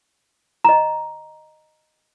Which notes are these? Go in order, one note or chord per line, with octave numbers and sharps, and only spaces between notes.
D#5 A#5